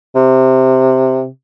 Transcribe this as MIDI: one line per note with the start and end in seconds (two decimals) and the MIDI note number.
0.16 1.27 48